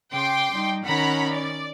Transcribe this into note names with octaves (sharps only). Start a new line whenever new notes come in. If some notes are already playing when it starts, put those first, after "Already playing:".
C#3 G5 C6 D6
G3 D#4
D#3 C#4 F#5 A#5 B5
D5